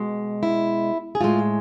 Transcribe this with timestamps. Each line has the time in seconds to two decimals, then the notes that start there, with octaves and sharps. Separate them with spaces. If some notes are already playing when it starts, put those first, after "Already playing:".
Already playing: B2 G#3
0.43 E4
1.15 G#4
1.21 A2 G#3 F4